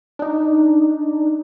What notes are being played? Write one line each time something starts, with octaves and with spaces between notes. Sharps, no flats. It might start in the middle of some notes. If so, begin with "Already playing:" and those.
D4 D#4